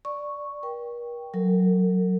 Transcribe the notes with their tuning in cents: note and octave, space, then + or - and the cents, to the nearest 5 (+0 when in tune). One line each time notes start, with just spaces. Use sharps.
D5 +0 C#6 +0
A#4 +45 G5 +0
F#3 +0 A#4 -45